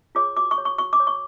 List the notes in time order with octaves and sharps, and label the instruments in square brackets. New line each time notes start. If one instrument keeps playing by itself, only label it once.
[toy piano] F4 G#4 C#5 D6
F#4 D6
C#6
C#5
C#6
F#4 C#6
D6
C#5
C#6